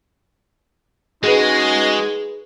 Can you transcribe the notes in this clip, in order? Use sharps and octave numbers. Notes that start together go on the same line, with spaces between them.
G#3 C#4 D#4 F#4 G#4 B4 D#5